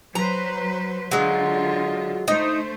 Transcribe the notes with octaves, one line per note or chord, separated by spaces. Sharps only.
F#3 B4 C5 A#5
D3 F#3 G#3 F4
A3 D#4 C5